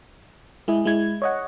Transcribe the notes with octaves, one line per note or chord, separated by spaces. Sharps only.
G#3 E4 G#4
G#3 E4 G#6
C#5 D#5 F#5